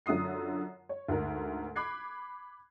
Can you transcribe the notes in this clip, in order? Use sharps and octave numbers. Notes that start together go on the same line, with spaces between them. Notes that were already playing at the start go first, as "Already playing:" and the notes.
F#2 D3 F4 D#6 C7
C#5
D2 G#2 A#4
B5 D6 F#6 G#6 C7